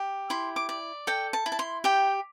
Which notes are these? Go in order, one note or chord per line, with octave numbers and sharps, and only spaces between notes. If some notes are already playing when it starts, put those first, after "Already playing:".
Already playing: G4
E4 C6
D6
D5
A4 G5
A5
E4
A5
C6
G4 G5